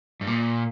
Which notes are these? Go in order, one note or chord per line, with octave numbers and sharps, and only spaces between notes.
G2
A#2